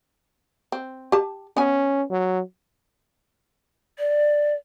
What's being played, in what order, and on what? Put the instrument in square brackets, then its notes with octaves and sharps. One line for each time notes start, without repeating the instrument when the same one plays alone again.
[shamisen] C4
G4 A5
[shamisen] B3 G#5 [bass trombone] C#4
[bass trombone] F#3
[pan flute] D5